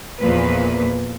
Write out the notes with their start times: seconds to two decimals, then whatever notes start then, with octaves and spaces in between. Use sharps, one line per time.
0.19 E2 A#2 F3 B4